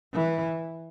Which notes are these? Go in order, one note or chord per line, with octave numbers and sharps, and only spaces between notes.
E3